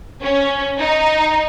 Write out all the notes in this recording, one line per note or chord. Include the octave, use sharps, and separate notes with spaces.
C#4
D#4